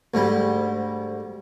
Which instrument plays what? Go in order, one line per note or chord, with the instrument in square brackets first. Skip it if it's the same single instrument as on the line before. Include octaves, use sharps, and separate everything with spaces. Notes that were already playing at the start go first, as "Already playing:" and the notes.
[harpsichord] D2 G#2 G3